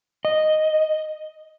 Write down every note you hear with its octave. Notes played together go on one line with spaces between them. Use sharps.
D#5